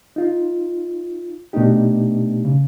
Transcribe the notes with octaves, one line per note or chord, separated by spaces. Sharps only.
D#4 F4
B2 A3 B3 D4 D#4 G4
C#3